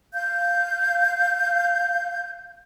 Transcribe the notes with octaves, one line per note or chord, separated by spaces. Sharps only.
F5 G6